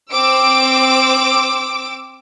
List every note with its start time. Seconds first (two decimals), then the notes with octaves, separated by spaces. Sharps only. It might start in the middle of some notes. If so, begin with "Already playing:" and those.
0.12 C4 D6 E6 D7